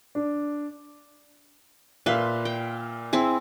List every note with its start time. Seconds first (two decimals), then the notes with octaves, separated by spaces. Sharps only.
0.15 D4
2.06 A#2 B4 E5 F5 C6
2.45 G5
3.13 C4 E4 G#4